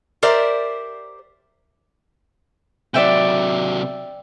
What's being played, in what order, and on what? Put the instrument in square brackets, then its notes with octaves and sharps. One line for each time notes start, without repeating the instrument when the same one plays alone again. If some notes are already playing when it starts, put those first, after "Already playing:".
[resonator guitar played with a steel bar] G4 A#4 C5 D5 E5
[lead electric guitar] C3 F#3 [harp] D5 E5 G5